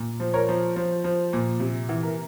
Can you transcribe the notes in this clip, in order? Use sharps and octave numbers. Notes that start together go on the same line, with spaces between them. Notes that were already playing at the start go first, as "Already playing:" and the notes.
Already playing: A#2
F3
A#4 C#5
F3
F3
F3
A#2
C3
E3
A#4